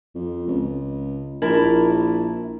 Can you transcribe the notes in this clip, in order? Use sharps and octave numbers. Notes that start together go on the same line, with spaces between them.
F2
C#2
A#1 E4 A#4 A5